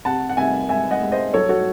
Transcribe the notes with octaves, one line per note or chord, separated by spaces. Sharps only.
C3 F#5 A5
F#5
C3 E5 G#5
G#3 E5 G#5
D#5 F#5
G#3
C5 D#5
F#3 A4 C#5
F#4 A4